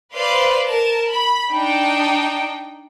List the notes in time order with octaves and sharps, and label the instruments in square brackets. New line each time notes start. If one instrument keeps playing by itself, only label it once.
[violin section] B4 C5 D5 F5 C6
A#4 A5
B5
D4 D#4 G5